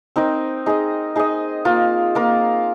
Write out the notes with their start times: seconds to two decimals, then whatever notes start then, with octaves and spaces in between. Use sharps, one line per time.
0.16 C4 D#4 A#4 D#5
0.66 D#4 G#4 D#5
1.16 D#4 G#4 D#5
1.65 A#3 F4 A#4
2.15 A#3 F4 A#4